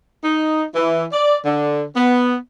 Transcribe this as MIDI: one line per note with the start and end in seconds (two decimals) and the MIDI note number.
0.23 0.64 63
0.75 1.05 52
1.12 1.37 74
1.46 1.84 50
1.96 2.36 59